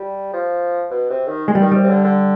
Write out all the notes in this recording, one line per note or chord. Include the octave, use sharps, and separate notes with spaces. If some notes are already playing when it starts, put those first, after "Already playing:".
Already playing: G3
F3
B2
C3
D#3
G#3
G3
D#3
C3 G3
C3
D3
D3